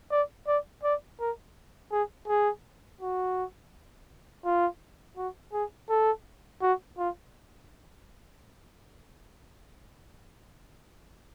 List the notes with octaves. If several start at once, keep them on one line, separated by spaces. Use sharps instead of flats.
D5
D5
D5
A#4
G#4
G#4
F#4
F4
F#4
G#4
A4
F#4
F4